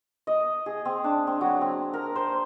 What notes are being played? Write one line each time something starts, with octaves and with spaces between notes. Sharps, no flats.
D#5
G#4
C4
D4
C4
F#3
C4
A#4
C5